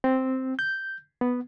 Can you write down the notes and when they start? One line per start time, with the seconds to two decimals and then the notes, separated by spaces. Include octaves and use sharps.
0.04 C4
0.59 G6
1.21 B3